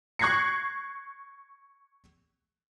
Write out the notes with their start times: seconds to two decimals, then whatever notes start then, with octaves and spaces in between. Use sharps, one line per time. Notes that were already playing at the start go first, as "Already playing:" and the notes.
0.19 C#6 F#6 G#6 A#6 C7 C#7